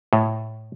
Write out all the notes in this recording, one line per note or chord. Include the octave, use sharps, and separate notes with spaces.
A2